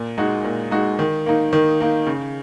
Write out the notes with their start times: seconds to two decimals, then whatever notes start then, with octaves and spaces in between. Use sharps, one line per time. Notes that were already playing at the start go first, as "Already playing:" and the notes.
Already playing: A#2
0.18 G#3 D#4 F#4
0.44 A#2
0.71 G#3 D#4 F#4
0.99 D#3
1.26 A#3 D#4
1.53 D#3
1.81 A#3 D#4
2.07 C#3